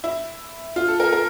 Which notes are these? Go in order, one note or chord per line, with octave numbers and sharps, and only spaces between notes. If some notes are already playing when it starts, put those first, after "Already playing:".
E4
F4
A4
A#4
A#4